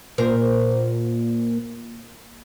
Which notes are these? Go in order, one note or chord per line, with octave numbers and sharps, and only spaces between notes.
A#2 A#4 C5